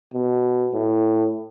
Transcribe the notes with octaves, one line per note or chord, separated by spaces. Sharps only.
B2
A2